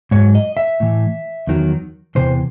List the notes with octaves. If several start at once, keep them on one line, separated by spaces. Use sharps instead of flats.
G#2 F#3 C#5
D#5
E5
A2 E3
E2 D#3 F#3
E2 C3 E3 C5